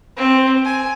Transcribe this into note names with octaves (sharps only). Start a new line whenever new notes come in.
C4
G#5